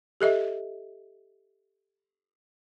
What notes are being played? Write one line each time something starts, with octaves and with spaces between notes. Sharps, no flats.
G4 A4 D#5 E5